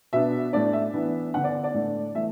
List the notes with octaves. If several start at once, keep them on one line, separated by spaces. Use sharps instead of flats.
B2 B3 D4 E5
A2 A3 D4 D5
E5
E3 B3 D4
D3 B3 D4 F#5
D5
D5
A2 A3 D4
E3 A3 E5